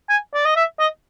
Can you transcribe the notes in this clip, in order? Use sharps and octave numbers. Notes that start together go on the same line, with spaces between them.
G#5
D5
D#5
E5
D#5